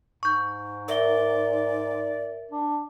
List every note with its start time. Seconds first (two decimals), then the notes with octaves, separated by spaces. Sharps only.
0.23 G#2 C#6 G6
0.88 A#4 D5 E5 G7
2.51 D4